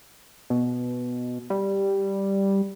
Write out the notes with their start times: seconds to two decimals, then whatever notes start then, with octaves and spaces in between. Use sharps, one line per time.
0.50 B2
1.50 G3